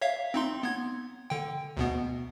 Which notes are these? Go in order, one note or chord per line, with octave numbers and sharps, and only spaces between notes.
C#5 E5 F5
C4 D#4 C6
B3 G#6
D3 G5
D2 B2 B3